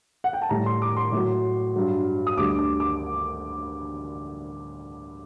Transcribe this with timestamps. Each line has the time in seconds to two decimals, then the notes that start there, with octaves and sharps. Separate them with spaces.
0.24 F#5
0.33 G5
0.42 A5
0.49 A2 G3 A#5
0.66 C6
0.82 D6
0.97 C6
1.12 A2 F#3
1.76 G2 F#3
2.27 D#6
2.37 D2 D3 G3 D6
2.59 D6
2.80 D6